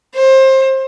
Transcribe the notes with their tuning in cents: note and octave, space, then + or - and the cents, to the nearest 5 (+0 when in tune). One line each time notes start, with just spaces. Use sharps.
C5 +25